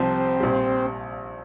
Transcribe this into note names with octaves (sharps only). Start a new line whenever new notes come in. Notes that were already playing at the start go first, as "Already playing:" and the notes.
Already playing: C2 C3 F3 C4
A#1 A#2 G3